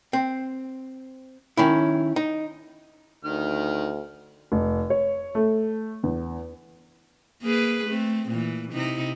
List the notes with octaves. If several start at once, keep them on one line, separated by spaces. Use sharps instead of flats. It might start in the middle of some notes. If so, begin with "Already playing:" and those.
C4
D#3 C#4 E4
D#4
D2 D#3 F6
F1
C#5
A3
E2
A#3 G#4 B4
A3 C4
A#2 E3
C3 D#4 E4